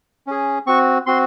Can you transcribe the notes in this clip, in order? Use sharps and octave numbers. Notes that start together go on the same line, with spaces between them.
C#4 G#4
C4 F#4 C#6
C4 F#4 C6